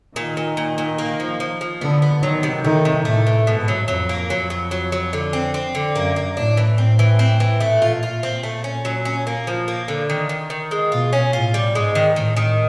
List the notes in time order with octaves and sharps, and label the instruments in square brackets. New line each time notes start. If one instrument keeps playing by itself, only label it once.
[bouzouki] A#2 [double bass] D#3
[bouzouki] A#2
A#2
A#2
A#3
F3
F3
F3
[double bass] D3 [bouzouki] B3
[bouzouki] B3
[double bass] D#3 [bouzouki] F#3
[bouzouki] C3
[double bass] D#3 [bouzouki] A3
[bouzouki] C3
[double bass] A2 [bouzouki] A3
[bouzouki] E3
[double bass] G#2 [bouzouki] B2
[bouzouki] F#3
[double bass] F2 [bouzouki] F#3
[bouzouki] A#3
[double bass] F2 [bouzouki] F#3
[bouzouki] F#3
F#3
F#3
D3
C4
C4
D3
[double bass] F#2 [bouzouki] A#3
[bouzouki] A#3
[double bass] A2 [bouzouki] D4
[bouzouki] E3
[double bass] A2 [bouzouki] C4
[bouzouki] E3
C4
E3
[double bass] A#2 [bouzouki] A3
[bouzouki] F4
F4
C4
A3
C#4
F#3
C#4
A#3
F3
A#3
D3
D#3
D#3
D#3
G#3
[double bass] B2 [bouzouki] F4
[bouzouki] C#4
[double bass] A2 [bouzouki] F4
[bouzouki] G3
[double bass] G#2 [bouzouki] G#3
[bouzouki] D#3
[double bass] A2 [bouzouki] D#3
[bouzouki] D#3